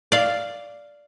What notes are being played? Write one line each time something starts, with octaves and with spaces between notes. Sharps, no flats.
D5 F5